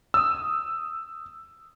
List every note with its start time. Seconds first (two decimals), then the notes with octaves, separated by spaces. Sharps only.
0.14 D#6 E6